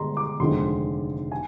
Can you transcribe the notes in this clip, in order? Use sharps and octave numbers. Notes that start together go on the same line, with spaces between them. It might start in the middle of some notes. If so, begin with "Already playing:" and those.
Already playing: G1 G2 D3 G#3 A#5 C6
D6
F1 D#2 D3 F3 G#3 C6
G#5